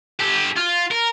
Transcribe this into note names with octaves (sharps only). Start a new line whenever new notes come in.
G4 A4
F4
A#4